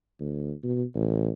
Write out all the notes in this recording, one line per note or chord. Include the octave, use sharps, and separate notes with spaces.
D2
B2
A1